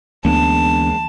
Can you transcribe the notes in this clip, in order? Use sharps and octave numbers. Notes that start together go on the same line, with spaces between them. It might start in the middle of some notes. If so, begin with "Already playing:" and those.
D2 E3 G#3 A#3 B3 C#4 D4 A5